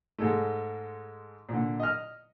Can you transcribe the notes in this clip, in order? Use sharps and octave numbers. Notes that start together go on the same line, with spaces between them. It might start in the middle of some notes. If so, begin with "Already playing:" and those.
G#2 G#3 A3
A#2 D3
D#5 F6